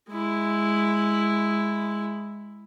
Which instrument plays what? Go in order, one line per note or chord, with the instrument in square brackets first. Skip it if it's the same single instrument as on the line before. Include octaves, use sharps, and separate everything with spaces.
[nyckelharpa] G#3 E4